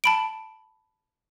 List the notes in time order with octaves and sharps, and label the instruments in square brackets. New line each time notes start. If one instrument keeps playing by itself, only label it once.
[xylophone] A5 B5 D7